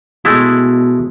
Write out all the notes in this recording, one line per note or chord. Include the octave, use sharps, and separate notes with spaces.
B2 G#3 A3 E4